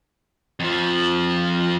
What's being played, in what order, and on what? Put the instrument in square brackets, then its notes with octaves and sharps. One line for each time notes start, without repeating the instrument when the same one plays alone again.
[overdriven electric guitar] F2 F3